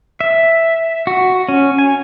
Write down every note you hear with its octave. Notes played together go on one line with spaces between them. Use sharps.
E5
F#4
C#4
G#5